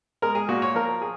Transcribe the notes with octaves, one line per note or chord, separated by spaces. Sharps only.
G#3 A#4
G#4
A#2 F#4
C#5
F3 A#4
G#4